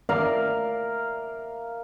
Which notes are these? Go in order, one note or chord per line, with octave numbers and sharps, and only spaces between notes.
A#4 D5 E5 F5